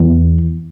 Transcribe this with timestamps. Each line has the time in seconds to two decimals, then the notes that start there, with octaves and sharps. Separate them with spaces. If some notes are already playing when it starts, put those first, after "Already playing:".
Already playing: E2